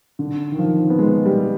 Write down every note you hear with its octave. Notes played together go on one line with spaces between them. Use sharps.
D3
D#3
F3
B3
G#3
G3